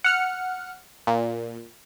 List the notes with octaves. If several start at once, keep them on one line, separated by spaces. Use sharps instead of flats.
F#5 F6 C#7
A#2